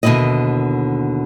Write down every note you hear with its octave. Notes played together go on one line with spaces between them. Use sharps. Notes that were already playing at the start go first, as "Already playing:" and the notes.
D#2 B2 D3 E3 E4 D#5